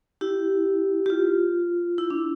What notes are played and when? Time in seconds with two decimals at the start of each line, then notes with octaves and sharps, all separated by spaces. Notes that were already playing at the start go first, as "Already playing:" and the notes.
0.21 E4 G4
1.06 G4
1.10 F4
1.98 E4
2.10 D4